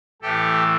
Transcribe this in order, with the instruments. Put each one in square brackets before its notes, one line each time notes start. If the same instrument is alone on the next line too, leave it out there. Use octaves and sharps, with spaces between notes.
[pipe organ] A2 E3 A3 G4 A4